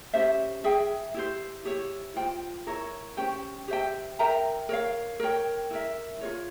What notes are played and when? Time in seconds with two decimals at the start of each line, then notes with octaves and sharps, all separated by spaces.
0.13 C#4 G4 C5 E5
0.64 G#4 E5 G5
1.14 E4 G4 C5
1.65 E4 G4 C#5
2.16 F4 C5 G5
2.67 E4 A#4 C#5
3.17 C#4 G4 C5 G5
3.68 G4 C5 E5 G5
4.19 A#4 E5 G5 A#5
4.69 A#4 C#5 F5
5.20 A#4 C#5 G5
5.71 E4 A#4 E5
6.21 F4 A#4 C#5